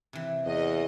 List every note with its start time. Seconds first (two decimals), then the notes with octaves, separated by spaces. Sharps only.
0.13 C3 E3
0.46 E2 D#5